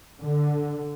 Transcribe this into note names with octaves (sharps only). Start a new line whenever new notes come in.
D3